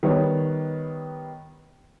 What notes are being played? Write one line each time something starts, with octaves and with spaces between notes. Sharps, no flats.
D#3 G3 B3 B4 C#5